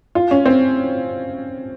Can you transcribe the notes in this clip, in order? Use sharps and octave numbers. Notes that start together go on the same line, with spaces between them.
F4
C#4
C4